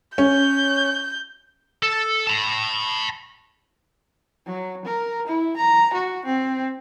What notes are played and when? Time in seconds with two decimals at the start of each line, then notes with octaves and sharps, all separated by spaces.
0.18 C#4 G6
1.83 A4
2.27 A5 B5
4.46 F#3
4.85 A#4
5.27 E4
5.57 A#5
5.94 F#4
6.25 C4